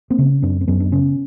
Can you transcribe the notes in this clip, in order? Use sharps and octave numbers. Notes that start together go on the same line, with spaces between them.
A#3 C4
C#3
F#2 C4 D4
C4
F#2 B3 C#4
D4
C#3 B3 C#4